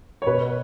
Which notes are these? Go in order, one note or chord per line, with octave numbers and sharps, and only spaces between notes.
C#5
B2 B4